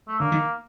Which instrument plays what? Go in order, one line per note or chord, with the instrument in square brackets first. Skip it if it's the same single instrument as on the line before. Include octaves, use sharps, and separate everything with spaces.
[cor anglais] A3
[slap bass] D3 [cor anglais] A#3
[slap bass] D#3